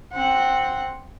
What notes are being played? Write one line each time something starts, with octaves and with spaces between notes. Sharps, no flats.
C4 F#5